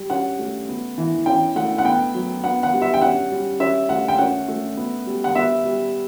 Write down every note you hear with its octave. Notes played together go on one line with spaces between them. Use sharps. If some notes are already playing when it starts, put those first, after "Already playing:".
Already playing: G3
C#4 F#5
A3
B3
E3
C#4 G5
A3 F#5
F#5
B3 G5
F#3
B3 F#5
F#5
G3
E5
G5
C#4 F#5
G3
C#4 E5
A3 F#5
G5
C#4 F#5
A3
B3
G3
F#5
B3 E5
G3